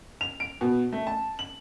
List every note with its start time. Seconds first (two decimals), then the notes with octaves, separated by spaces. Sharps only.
0.21 F7
0.40 D7
0.61 B2
0.93 A3
1.07 A5
1.39 F#7